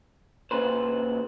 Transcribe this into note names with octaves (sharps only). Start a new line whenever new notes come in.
A#2 C#3 B4 C5